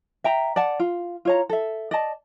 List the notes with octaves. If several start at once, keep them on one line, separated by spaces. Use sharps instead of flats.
E5 G5 A#5
D5 F#5 A5
F4
F4 C#5 A#5
A4 E5
D5 D#5 A5